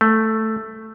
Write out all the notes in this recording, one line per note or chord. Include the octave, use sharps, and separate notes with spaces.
A3